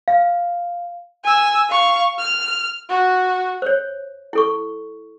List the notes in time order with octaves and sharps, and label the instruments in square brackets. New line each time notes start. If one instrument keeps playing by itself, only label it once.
[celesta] F5
[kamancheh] G#5 E6
F5 C#6
F6
F#4
[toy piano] C5 C#5
E4 A4 C#6